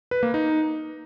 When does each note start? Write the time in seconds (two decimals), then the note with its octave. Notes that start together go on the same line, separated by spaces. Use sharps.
0.11 B4
0.23 A#3
0.34 D#4